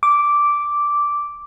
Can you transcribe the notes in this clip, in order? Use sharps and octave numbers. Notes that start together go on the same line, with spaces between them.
D6